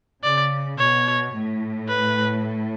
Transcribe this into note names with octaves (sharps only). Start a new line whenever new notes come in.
C#3 D5
B2 C#5
A2
B4